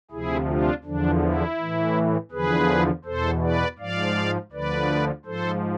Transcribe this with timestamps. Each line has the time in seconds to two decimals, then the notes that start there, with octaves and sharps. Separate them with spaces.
0.11 D2 C3 F3 E4 G#4
0.48 D4 F4
0.84 E2 D3 F3 D4
1.21 E4
1.58 A2 E3
2.31 E2 D3 F3 G#4 B4
3.05 E2 B2 A4 C5
3.42 B4 D5
3.79 G#2 F3 D5 F5
4.52 D2 D3 F3 B4 D5
5.26 G#2 F3 A4 C5